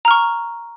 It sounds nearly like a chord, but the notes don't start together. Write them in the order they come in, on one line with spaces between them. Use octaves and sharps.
A#5 F6 C#6